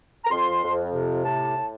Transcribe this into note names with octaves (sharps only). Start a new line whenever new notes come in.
A#5
F2 C6
F2
C3
A2 A5
A2